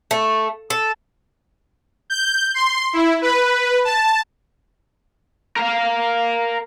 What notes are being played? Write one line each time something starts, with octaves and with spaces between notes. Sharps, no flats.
A3
A4
G6
C6
E4
B4
A5
A#4 F5